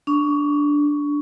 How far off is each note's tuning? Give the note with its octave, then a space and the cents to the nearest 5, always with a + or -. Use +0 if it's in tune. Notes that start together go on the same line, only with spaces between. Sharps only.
D4 -5 C#6 +15